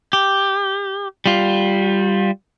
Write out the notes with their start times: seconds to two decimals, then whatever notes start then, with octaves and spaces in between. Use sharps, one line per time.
0.13 G4
1.26 G3 F4